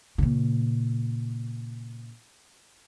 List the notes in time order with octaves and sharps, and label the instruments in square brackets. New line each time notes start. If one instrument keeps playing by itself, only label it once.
[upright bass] A#2 C#3